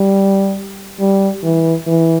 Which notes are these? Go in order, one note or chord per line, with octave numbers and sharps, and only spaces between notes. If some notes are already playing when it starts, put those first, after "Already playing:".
Already playing: G3
G3
E3
E3